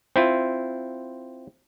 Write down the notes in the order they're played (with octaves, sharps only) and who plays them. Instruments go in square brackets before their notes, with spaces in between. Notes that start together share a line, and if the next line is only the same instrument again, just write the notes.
[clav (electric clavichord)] C4 E4 F4